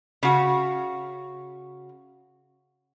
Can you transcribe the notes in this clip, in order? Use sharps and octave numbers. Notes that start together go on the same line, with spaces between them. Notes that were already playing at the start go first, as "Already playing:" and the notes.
C#3 F#4